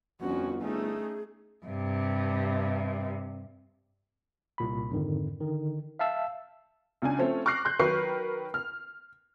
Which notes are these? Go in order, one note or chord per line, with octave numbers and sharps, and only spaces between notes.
G1 F2 C#4 F#4
A3 C#4 D#4 G#4
G2 C3
C2 A#2 B5
F2 G#2 D3 D#3
D3 D#3
E5 F5 A5 E6
C#2 C#3 D4 G#5
F3 A3 C4 C#4
C#6 D6 F6 F#6 A#6 C7
C6 F#6 G6
D#3 F#3 A#4 B4 C#6 C7
F6